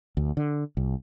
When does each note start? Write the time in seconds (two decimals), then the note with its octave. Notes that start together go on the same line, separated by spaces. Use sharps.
0.17 D2
0.37 D3
0.77 C2